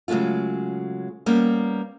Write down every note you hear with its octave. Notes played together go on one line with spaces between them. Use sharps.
C#3 F#3 G#3 A3 F4
G3 A#3 B3 C#4